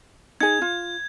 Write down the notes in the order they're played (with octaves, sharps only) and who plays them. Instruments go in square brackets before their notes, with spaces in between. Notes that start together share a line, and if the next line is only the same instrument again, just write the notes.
[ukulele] D#4 G#4 [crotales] G#6
[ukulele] F4